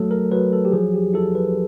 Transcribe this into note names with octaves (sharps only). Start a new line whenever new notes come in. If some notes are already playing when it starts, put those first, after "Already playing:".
Already playing: F#3 A3 A4
A#4
F#3 B4
A4
G4
F3 G#4
G4
E4 A4
B4